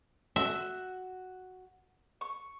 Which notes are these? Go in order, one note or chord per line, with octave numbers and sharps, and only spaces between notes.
F#4 E5
C#6